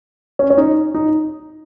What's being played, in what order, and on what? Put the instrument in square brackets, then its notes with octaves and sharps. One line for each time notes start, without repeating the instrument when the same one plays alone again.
[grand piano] C#4
C#4
D#4
D#4